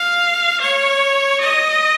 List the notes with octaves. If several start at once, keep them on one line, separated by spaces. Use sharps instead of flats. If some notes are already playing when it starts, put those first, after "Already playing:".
Already playing: F5
C#5
D#5